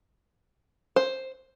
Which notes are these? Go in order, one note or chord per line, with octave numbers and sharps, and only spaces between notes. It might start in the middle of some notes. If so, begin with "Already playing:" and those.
C5